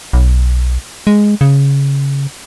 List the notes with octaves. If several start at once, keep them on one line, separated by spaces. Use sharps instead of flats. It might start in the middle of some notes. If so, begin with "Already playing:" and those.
B1
G#3
C#3